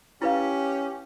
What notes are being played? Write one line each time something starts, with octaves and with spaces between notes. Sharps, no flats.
C#4 E4 G4 B4 F5